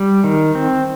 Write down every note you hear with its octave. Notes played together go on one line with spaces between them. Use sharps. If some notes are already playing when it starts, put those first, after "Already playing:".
Already playing: G3
D#3
C4